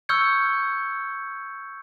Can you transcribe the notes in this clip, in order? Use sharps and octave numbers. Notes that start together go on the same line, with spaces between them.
C#6 E6 F6 G6 G#6 C#7